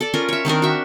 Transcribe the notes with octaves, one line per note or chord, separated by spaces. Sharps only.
A4 D5
C#4 F4 A#4
C#5 E5
D#3 C4 D4 A#4
F#4 E5